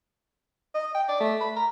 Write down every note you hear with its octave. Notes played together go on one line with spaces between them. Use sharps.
D#5
G5
D5
A3
B5
A#5